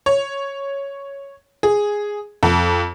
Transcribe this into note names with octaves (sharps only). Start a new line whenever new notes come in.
C#5
G#4
F2